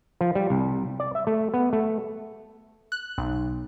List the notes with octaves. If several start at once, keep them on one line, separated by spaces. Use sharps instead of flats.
F3
G3
C2
D5
E5
A3
B3
A3
F#6
B1